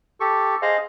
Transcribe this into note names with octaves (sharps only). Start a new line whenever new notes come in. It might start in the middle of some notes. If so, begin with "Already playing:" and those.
G4 A4 C#6
G#4 C5 D#5 F5